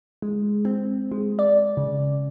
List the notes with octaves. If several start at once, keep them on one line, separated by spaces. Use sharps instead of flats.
G#3
C4
G#3
D5
C#3